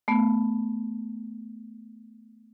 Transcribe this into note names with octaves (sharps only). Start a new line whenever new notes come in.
A3 B3